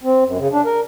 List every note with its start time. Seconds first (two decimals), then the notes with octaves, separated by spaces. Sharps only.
0.03 C4
0.25 F#2
0.38 C#3
0.52 D4
0.65 A#4